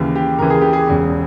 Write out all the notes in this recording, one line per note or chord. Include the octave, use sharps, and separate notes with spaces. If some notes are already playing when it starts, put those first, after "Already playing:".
Already playing: D#2 C#3 E3
G4
D#2 C#3 E3 A#4
G#4
G4
G#4
E1 E2 C#3